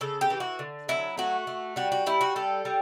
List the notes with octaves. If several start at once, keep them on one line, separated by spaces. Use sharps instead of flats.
C#3 A4
G4
E3
F#4
D3
F#3 E4
A3 F#4
A3
G3 F#4
F#4
G3 E4
F#4
G3 A4
G3